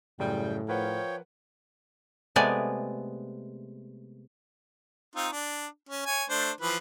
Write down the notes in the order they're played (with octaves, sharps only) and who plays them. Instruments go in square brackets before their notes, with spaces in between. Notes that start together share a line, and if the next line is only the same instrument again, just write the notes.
[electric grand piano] F#2 C#3 [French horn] A2 [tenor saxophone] G3 [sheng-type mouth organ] G5
[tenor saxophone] F3 [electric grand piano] A#4 B4 F#5 [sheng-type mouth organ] C#5 G5
[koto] C3 G#3 A3 B3 D5 G#5
[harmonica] C4 D#4 F4
D4
C#4
C#5 G#5
A3 D4 C5
E3 F3 B4